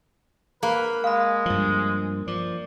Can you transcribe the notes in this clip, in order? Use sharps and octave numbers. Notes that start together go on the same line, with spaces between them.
A#3 B4
G#3 F5 B5
G2 F3
F3 D5